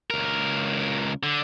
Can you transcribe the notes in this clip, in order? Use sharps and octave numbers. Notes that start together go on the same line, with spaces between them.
C#2 A#4
D3